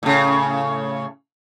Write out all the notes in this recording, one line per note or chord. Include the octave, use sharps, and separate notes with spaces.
A2 C#3